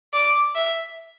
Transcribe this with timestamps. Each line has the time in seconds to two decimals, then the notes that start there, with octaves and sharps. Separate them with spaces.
0.13 D5
0.55 E5